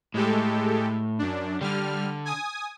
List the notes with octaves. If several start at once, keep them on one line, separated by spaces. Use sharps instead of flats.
A2 G#3 G4 A4
F#2 D4
D3 G3 F6
G#5 D#6